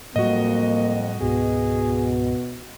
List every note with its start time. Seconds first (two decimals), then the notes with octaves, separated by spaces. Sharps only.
0.16 F2 A2 F#3 G3 A#3 F#4 D#5
1.21 C#2 G#2 B2 G#4